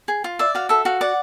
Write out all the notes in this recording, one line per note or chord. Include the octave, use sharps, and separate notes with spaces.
G#4
F4
D5 E5
F#4 F5
A4 E5
F#4 F5
D5 F#5